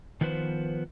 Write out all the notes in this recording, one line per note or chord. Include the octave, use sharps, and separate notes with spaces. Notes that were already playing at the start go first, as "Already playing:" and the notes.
D#3 F3 B3 B4 C5